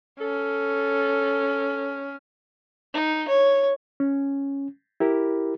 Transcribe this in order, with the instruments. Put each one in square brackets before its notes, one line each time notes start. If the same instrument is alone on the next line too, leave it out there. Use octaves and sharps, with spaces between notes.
[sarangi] C#4 [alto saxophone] A4
[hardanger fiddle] D#4
C#5
[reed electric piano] C#4
E4 G4 A#4